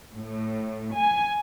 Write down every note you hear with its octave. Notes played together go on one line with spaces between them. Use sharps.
A2
G#5